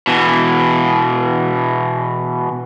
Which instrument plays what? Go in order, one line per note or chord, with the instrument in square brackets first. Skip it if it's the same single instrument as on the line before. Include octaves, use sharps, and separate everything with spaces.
[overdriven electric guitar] B2 E3